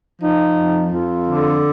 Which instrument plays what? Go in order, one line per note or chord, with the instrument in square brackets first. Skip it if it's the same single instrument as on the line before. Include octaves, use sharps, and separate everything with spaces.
[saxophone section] F3 D#4
F2
F2 F4
D3